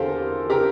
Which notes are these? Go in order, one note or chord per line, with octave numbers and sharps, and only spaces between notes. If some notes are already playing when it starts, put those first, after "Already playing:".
Already playing: E2 D3 F4 G4 A4 A#4 C5
G4 A#4